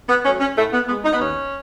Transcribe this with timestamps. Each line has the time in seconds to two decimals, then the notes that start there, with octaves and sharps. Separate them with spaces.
0.09 B3
0.25 F#3 A3 C#4
0.40 C#4
0.56 A2 A3
0.72 B3
0.88 G#3 B3
1.04 D#4
1.13 B3
1.20 D#2 C#4